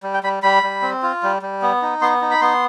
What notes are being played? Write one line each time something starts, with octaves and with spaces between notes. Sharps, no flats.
G3
G5
G3 B5
G3 B5
G3
C4
F4
G3
G3
B3
D#4
B3 C6
D#4
B5
B3 C6